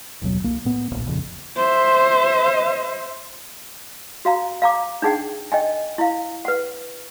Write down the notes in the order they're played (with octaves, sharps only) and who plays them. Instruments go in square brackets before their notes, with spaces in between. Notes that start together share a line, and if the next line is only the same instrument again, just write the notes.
[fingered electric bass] F#1 D#2 B2 F#3
C2 A#3
A2 B3
D1 B1 A#2
F1 A#1 F2 C#3
[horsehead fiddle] C5 E5
[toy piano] F#4 F5 A#5
F5 A#5 D6
D4 D#4 G#4 F#5 G5
D#5 G5 G#5
E4 F5
B4 F#5